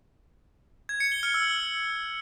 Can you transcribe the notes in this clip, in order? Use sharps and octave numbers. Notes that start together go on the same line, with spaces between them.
G#6
C#7
G7
F6
E6